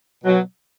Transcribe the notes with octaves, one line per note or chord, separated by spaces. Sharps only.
B2 F#3